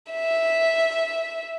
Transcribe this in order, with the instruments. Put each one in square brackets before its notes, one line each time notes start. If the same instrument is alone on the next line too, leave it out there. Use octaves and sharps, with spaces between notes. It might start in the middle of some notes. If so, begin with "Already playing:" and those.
[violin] E5